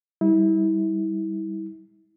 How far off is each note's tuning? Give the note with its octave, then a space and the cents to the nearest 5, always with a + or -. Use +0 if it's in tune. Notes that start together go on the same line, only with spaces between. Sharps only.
G3 +0 E4 -35